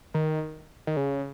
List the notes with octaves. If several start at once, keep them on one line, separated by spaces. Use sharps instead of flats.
D#3
D#3
C#3